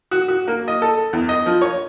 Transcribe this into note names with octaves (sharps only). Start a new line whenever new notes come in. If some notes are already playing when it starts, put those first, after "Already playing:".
F#4
F#4
A#3
D#5
A4
E2
D#5
F3
C#5